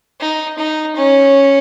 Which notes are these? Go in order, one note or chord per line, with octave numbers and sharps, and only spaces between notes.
D#4
D#4
C#4